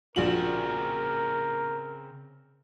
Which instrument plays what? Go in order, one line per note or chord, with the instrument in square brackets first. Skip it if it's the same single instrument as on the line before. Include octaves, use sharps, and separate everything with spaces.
[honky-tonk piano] A#1 F#7 [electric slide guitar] C#3 C4 [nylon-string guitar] F4 F#4 [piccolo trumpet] A#4